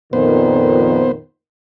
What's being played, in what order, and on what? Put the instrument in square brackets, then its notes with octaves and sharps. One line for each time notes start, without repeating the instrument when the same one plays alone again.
[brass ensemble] F2 A#2 D#3 [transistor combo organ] B3 C5